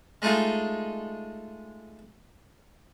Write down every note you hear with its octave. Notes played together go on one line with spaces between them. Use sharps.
G#3 A3 D#4 F4 G#4